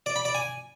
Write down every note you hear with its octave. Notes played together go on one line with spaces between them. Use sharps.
D5
B5
D5
G#5